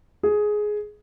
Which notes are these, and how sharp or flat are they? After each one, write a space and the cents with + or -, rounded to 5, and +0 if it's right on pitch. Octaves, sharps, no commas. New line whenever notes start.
G#4 +10